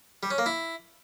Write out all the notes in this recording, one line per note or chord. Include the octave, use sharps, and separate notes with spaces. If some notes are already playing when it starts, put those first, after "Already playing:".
G3
C#4
A#3
E4